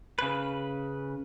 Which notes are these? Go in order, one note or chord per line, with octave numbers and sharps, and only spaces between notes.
C#3 B4